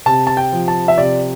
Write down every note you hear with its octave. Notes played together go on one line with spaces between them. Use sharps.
C3 A5
A5
G5
F3
A5
E5
C3 D5